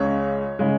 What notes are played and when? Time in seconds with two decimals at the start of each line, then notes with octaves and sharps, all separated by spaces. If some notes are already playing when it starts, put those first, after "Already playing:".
Already playing: C#2 C#3 G#3 C#5
0.59 C#3 G#3